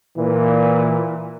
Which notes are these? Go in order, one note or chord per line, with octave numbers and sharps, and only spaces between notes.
A#2 E3